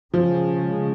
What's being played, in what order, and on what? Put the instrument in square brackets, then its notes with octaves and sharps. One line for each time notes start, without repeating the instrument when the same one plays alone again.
[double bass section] C#3 G#3 C#4 [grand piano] F3